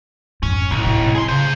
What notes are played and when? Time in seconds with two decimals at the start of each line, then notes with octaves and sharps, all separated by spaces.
0.43 F2 G#2 C#4
0.71 F1 B1 A2 C3
0.86 C3
1.15 G#4 C6
1.28 C#3 A3 C5